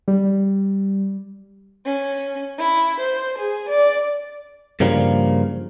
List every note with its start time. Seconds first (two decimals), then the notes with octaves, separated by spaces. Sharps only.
0.08 G3
1.86 C#4
2.59 E4
3.00 C5
3.38 G#4
3.70 D5
4.80 G2 C#3 F3 G3 A#3